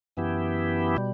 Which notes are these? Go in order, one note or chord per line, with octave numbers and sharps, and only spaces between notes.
F#2 E3 B3 E4 G4
B2 G3